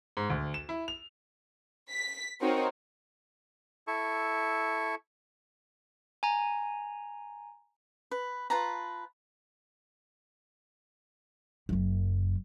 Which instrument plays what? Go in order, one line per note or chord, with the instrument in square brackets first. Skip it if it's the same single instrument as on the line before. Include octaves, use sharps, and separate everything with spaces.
[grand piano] G#2
D2
E7
E4
F7
[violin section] B6
C4 D#4 F#4 A#4 C5 C#5
[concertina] E4 A4 C#6
[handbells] G#5 A#5
[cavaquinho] B4
F4 B4 A5 A#5
[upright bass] F#1 F#2